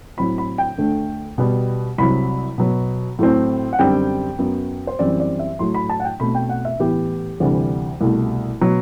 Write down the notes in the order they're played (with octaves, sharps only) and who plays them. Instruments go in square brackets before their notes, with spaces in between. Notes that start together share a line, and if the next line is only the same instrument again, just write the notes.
[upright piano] A2 F#3 C4 B5
B5
G5
D2 D3 A3
B2 G3 B3
C2 C3 F#3 B5
B2 F#3 B3
A2 F#3 A3 C4
F#5
F#2 D3 G3 C4 G5
F#2 F#3 B3
C5
F#2 E3 G3 C4 D5
D5
E5
A2 F#3 A3 C6
B5
A5
F#5
G5
B2 A3 C4 B5
G5
F#5
E5
A2 E3 B3 G4
D2 C3 E3 G3
C2 B2 A3
B2 F#3 B3